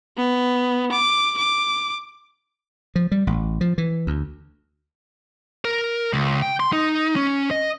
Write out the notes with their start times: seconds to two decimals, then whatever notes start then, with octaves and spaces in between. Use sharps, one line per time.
0.17 B3
0.92 D6
1.38 D6
2.96 F3
3.12 G3
3.27 A1
3.61 F3
3.78 E3
4.07 D2
5.65 A#4
6.13 C#2
6.42 G5
6.60 C6
6.73 D#4
7.16 C#4
7.51 D#5